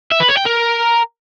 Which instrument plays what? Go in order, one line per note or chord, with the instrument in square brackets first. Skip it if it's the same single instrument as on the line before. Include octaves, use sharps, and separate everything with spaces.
[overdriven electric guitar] E5
B4
C#5
G5
A#4